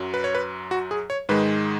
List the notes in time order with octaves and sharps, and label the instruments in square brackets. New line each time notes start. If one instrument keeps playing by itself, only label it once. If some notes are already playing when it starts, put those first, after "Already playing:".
Already playing: [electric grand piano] F#2 F#3
B4
C#5
B4
F#4
G#4
C#5
G#2 D#3 G#3 B4